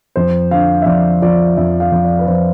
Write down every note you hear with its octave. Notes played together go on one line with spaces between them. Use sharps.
F2 C5
D3 F5
E5
F2 D5
F3 D5
F2 E5
F5
F2
D5
B4
F2 C5